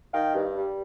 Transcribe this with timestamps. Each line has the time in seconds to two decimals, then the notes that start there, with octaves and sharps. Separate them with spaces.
0.12 D#3 F5 G5
0.33 G2
0.55 G3